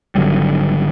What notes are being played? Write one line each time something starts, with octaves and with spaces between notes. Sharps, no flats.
G#1 D3 F#3 G3